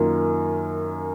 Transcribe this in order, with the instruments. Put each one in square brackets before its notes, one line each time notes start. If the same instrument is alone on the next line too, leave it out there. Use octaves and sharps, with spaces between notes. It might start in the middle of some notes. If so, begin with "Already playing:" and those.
Already playing: [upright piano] F#2 D#3 A#3 F4 A#4